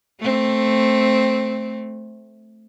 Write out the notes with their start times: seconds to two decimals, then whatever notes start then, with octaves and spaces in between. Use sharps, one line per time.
0.19 A3 C4